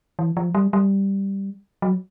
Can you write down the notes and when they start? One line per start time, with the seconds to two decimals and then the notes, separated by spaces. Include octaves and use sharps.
0.19 E3
0.37 F3
0.55 G3
0.73 G3
1.82 F#3